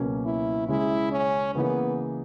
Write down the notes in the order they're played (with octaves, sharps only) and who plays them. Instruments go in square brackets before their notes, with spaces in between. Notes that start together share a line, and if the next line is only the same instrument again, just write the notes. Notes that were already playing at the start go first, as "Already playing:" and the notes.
Already playing: [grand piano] C#2 B2 F#3 A#3 C#4
[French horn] E4
[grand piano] C#3 G#3 C#4 G#4 [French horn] E4
[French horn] C#4
[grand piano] C#3 E3 A#3 D#4 G#4 [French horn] B3